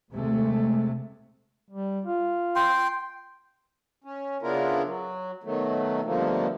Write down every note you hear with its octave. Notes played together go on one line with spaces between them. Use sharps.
D#2 C3 G#3 A3
G3
F4
G5 C6
C#4
C#3 B3 D4 E4 F4 A#4
F#3
B2 D#3 F#3 A3
G2 B2 D3 F3 A3 A#3